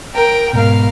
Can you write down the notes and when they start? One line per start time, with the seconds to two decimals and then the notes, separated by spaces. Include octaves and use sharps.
0.14 A#4 G5
0.53 G#2 B2 A#4 F5